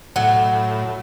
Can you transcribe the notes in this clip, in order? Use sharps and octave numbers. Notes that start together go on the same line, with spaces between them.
A2 F#3